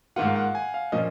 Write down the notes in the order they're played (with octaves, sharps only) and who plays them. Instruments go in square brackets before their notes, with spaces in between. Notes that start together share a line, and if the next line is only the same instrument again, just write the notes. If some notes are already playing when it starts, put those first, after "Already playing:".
[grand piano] G#2 D#3 A#3 F4 [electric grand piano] F#5
[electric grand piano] F5
F#5
G#5
F5
[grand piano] A#2 F3 A#3 C#4 [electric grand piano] D#5